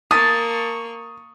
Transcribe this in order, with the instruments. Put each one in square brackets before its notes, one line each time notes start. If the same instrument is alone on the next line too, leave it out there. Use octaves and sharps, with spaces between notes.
[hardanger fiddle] A#3 C#6 [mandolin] A5 [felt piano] D#6